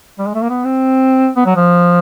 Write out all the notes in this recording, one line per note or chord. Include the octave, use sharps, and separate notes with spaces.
G3
G#3
A3
A#3
B3
C4
B3
F#3
F3